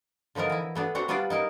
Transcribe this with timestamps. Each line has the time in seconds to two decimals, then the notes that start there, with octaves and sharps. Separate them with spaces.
0.35 D3 F3 B3 D#4 A#4
0.50 E3 E4
0.75 A3 B3 D4
0.95 C4 D4 F#4 F#5 A#5
1.08 G3 B3 D4 F4 B4 D5
1.30 D#4 E4 A#4